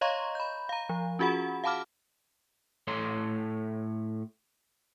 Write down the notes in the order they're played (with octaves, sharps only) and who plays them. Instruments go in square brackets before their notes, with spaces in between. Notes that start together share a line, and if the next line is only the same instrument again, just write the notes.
[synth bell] C#5 D#5 F5 A#5 C6 C#6
B5 G6
F5 A#5
F3
C#4 F4 F#4 G#4 F#5 B5
F5 F#5 A5 B5 D6 F6
[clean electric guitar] A2 A4 C#5 C6